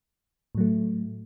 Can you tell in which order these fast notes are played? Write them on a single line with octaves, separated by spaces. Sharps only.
A2 F#3 A3